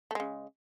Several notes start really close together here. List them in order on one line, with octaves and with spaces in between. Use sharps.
A3 G#3 C#3